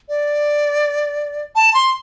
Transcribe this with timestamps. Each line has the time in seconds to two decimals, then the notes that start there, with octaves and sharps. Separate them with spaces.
0.09 D5
1.56 A5
1.74 C6